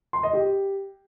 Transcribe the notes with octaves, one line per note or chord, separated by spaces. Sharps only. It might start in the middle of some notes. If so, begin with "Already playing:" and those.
C6
D#5
G4